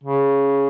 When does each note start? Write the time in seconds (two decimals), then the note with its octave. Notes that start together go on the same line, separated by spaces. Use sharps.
0.03 C#3